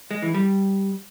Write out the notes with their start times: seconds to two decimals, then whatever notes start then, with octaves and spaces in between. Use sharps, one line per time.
0.11 G#3
0.23 E3
0.34 G3